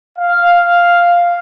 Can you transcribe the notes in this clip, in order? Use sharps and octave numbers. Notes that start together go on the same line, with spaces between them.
F5